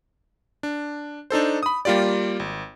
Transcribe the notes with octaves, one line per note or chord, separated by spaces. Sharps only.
D4
D4 D#4 A4 C5
B5 D#6
G3 A#3 F4 G4 D5
G#1